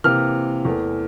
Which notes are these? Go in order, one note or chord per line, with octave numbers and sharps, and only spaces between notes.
C3 E3 A#3 F6
E2 E3 A3